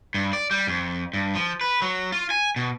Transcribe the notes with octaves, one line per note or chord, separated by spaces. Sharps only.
G2
D5
G3
F2
G2
F3
B4
F#3
F4
G#5
B2